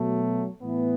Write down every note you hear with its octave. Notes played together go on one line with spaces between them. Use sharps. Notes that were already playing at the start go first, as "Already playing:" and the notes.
Already playing: B2 F#3 A3
A2 E3 B3